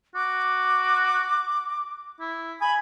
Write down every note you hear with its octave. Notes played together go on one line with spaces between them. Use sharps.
F#4 D6
E4
G#5 B5